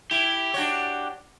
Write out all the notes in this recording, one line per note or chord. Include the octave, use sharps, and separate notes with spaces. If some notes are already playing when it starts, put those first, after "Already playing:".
E4 G4
D4 F#4 C#5